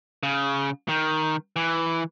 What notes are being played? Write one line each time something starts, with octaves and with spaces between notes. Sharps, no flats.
C#3
D#3
E3